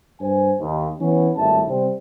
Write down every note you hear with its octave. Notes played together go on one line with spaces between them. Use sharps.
G2 C5 G#5
D#2
E3 B3 C#4
G#1 A2 G3 E5 A5
C3 G3 C4